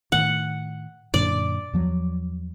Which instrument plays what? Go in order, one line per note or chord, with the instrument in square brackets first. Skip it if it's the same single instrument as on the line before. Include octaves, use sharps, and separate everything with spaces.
[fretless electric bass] A2 D#3 [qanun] F#5
[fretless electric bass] F#2 A#2 D3 [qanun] D5
[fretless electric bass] E2 F3 F#3